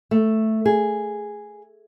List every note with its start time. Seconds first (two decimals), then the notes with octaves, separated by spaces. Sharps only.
0.11 A3
0.66 G#4